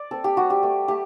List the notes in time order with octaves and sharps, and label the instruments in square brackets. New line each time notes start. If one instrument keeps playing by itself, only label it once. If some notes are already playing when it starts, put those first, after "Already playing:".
Already playing: [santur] D5
C4 A4
G4
G3 F#4
G4
A3
A3 G4